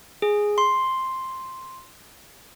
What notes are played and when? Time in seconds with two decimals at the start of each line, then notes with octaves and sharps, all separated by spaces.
0.22 G#4
0.58 C6